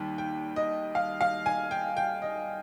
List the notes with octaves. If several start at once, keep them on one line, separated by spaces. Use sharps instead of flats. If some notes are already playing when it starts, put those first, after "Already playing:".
Already playing: D#2 D#3 G3
G5
D#5
F5
F5
G#5
G5
G5
D#5